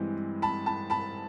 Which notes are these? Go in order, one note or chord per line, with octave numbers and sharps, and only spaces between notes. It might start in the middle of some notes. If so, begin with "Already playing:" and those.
Already playing: G2 E3 G#3 C4
A5 B5
A5 B5
A5 B5